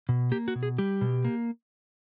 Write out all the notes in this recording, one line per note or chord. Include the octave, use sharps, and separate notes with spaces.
B2
A#3 G4
F#4
B2
G#4
G3 G4
B2
A#3